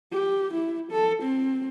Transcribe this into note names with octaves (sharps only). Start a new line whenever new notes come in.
G4
E4
A4
C4